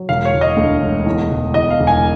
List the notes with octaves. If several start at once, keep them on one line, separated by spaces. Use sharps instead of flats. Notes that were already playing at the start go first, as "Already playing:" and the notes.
Already playing: F#3
E1 F5
C#5
E1
D#5
D2
E1
E2
E1
E2 D#5
F5
E1
G#5